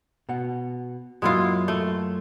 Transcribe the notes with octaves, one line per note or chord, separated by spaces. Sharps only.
B2 F#5
F#2 F#3 G#3 A#3 E4 F4
A3